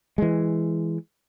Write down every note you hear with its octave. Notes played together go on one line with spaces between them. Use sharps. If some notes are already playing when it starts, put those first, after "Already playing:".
E3 G#3